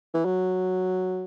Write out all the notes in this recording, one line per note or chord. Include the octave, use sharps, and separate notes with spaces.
E3
F#3